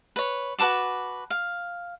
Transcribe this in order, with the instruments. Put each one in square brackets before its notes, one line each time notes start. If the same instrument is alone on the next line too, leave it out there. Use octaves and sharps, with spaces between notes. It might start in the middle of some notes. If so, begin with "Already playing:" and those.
[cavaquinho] B4 C#5
F#4 B4 A5 D6
F5